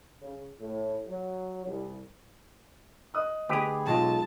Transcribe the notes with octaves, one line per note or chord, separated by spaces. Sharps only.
C#3
A2
F#3
C2
D#5 D#6 F#6
D2 G4 G#4 B4
B1 F#3 G#3 F4 A5